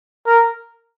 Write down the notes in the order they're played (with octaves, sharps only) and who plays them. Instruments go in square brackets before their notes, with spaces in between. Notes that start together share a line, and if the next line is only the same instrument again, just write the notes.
[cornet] A#4